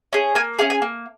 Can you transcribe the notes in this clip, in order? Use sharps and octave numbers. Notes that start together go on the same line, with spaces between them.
C#4 G#4
A#3 G#5
C#4 G#4 F5
G#5
A#3